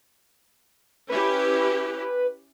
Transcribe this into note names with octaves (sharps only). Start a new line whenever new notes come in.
C#4 E4 G4 B4